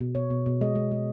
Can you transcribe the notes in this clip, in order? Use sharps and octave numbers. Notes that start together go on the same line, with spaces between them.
B2
B2 C#5
B2
B2
G#3 D#5
G#3
G#3